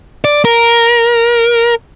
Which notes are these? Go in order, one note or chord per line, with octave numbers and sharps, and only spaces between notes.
D5
A#4